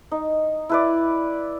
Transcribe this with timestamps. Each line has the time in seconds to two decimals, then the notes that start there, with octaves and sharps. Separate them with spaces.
0.11 D#4
0.69 E4 B4 D5